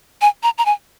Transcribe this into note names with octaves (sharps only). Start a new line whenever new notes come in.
G#5
A#5
A#5
G#5